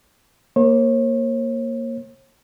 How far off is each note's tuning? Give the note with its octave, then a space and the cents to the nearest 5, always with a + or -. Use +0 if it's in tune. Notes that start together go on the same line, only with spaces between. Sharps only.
A#3 +0 C#5 -40